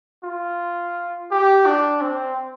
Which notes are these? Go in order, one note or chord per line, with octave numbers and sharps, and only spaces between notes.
F4
G4
D4
C4